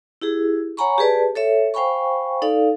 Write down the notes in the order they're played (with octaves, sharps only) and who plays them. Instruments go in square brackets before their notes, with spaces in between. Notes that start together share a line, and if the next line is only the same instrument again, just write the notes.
[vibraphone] E4 G4 G#4
C#5 F#5 G#5 A#5 B5 C#6
G4 G#4 B4 D5 A5
A4 C#5 E5
C5 F5 G5 G#5 B5 C#6
D#4 A4 D5 F5